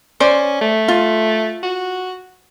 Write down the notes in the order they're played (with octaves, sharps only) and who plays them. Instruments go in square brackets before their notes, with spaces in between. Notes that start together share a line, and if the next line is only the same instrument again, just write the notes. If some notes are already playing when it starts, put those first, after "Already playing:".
[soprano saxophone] C#4 [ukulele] C5 D5
[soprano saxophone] A3
[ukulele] F4
[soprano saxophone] F#4